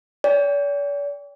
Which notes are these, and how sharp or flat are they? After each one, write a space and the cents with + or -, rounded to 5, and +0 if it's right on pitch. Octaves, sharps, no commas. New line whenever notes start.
D5 -45 G5 +30